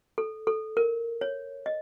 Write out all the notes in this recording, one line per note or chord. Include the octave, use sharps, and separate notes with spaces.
A4
A4
A#4
C#5
D#5